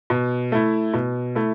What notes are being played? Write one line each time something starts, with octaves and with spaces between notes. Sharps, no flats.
B2
A3 E4
B2
A3 E4